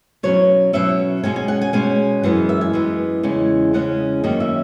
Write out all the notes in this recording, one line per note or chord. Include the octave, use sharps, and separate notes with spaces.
B2 F#3 C#4 C#5
B2 F#3 C#4 E5
B2 G#3 C#4 G#5
G#5
F#5
G#5
B2 G#3 C#4 G#5
F#2 E3 G#3 B3 F#5
E5
G#5
F#2 E3 G#3 B3
E2 C#3 G#3 C#4
E2 C#3 G#3 C#4 F#5
F#2 D#3 A#3 C#4 D#5
E5